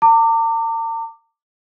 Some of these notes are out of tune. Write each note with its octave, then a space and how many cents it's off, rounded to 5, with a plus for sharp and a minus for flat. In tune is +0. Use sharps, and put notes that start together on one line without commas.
A#5 -45 D6 +5